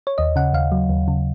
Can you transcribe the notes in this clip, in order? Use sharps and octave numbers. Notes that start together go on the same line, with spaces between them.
C#5
D#2 D#5
C#3 F#5
D#2 F5
F#3
D#2
C#3